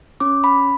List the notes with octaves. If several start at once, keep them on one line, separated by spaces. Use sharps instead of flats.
C#4 D6
B5